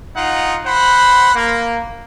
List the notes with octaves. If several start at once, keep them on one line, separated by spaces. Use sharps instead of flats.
D#4 F4 F#5
C5 F#5 B5
A#3